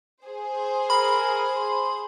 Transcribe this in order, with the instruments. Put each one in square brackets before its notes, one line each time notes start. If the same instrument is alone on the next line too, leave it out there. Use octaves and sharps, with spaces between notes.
[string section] G#4 C5
[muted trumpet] A#4 [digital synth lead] B5
[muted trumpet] C6